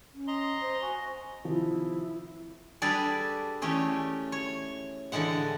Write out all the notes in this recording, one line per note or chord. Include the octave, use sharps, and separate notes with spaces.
C#4
D#5 A#5 C6
C5
F#4 G#5
C3 D#3 F3 E4
G3 D4 G#4 A4 B4 D5
E3 A3 C#4 G4 G#4
C#5
A2 D3 E3 G#3 F#5